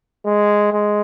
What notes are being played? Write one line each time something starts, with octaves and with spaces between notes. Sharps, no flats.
G#3
G#3